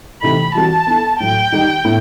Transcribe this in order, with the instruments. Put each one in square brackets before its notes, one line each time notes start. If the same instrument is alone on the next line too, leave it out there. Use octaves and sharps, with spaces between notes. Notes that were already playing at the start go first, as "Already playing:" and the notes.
[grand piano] C3 E3 A3 D#4 [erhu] B5
[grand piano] E3 G3 C4 F#4 [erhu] A5
[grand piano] B3 E4 A4
[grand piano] A2 F#3 A3 [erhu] G5
[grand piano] D#3 G3 D#4 G4
A2 B3 E4